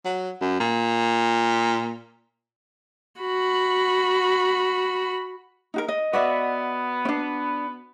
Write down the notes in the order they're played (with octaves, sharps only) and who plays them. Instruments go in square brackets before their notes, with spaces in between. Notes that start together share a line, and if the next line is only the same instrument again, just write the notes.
[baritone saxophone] F#3
F#2
A#2
[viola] F#4 B5
[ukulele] D#4 F#4 A#4
D#5
[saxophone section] B3 [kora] F#4 D5 E5
[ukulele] C#4 D4